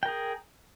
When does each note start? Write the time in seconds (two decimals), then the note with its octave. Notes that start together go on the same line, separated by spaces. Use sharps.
0.03 G5
0.06 A#4
0.08 G#4